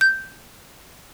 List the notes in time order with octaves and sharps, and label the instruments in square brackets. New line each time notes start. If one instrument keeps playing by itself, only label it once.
[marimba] G6